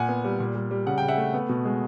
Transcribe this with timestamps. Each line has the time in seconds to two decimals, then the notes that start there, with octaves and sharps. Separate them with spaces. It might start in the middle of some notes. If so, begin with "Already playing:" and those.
Already playing: A#2 F#5 G#5
0.09 B3
0.24 G3
0.40 A#2
0.55 G3
0.71 G3
0.86 C#3 F#5
0.98 C#3 G5
1.08 E5 F#5
1.18 A3
1.34 B3
1.49 B2
1.65 G#3